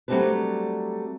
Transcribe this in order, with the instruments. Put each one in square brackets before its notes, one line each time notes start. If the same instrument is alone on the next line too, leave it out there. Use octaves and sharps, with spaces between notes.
[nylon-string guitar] F#3 G3 A3 C4 D4 B4